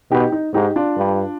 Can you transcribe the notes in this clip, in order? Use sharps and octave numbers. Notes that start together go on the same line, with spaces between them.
B2 D#4 G4
D#4
G#2 D#4 G4
D4 F4
G2